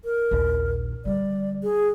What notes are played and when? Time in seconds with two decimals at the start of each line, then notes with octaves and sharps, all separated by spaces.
0.05 A#4
0.31 A#1 D#2
1.05 D3 G3 D5
1.63 G#4